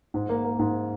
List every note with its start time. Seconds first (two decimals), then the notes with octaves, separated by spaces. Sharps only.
0.14 G#2
0.29 A#3
0.44 A#3
0.59 G#2